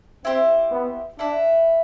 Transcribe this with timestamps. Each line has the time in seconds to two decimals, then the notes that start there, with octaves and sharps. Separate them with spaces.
0.25 C4 E4 G4 C5
0.72 B3
1.18 D4 E4 B4 E5